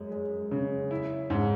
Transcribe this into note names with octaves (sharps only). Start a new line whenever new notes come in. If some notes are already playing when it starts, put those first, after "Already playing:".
Already playing: F#2 G#3
G#3
C#3
E4
G#2